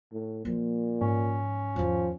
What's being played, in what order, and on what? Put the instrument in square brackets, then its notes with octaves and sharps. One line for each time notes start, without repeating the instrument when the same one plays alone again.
[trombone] A2
[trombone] A#2 [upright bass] F3 A#3
[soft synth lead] G#2 [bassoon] C#4
[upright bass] E2 D#3 [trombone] F3